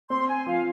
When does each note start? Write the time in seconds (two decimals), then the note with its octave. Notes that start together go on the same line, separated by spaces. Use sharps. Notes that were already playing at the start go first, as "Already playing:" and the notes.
0.09 C4 C6
0.27 G#5
0.46 F3 F5